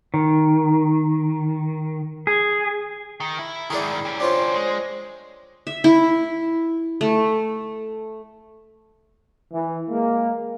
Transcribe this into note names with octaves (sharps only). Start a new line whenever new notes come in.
D#3
G#4
D#3
E4
G#2 D#3 E4 G#4 A#4 D5
C#4 G4
D4 F4 C5 C#5
G#3
E5
E4
A3
E3
G#3 A#3